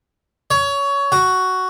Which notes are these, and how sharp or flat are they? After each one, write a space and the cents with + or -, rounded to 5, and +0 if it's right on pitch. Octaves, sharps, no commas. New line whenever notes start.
C#5 +20
F#4 +5